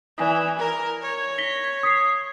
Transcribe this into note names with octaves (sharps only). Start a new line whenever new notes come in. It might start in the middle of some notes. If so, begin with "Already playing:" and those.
E3 D5 G#5 D#6
A#4
C#5
A#6 B6 G7
D#6 B6 C7